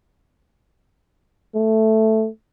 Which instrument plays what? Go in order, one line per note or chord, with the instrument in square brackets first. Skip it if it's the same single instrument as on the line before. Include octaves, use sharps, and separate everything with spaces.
[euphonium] A3